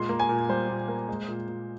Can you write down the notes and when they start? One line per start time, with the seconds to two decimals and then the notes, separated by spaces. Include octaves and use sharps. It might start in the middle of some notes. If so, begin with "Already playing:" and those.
Already playing: A#2 G#3 C6
0.09 A#3
0.19 G#5
0.29 A#2
0.49 G3 C5
0.69 A#2
0.88 A#3
1.08 G#3
1.28 A#2
1.48 A#2